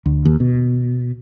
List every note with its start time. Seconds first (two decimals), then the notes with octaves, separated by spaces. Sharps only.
0.06 D2
0.25 D#2
0.40 B2